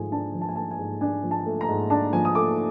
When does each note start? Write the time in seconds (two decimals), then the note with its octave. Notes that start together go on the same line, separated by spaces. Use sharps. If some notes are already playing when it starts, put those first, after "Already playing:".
Already playing: G#2 F3 A3 G#5
0.12 D4 A5
0.35 F3
0.41 A5
0.49 G#5
0.56 A3 A5
0.71 G#5
0.79 G#2
1.01 D4 G#5
1.23 F3
1.31 A5
1.46 A3
1.61 A#5
1.68 G#2
1.90 D4 A5
2.13 F3 G#5
2.25 D#6
2.35 A3 D6